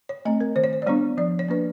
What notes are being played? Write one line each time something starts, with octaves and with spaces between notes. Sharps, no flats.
C#5
A3 C4 D#5
A#4
D#3 C5
C#5
C5
D5
G3 B3 D4 C#5
F3 D5
C#5
A#3 D4 B4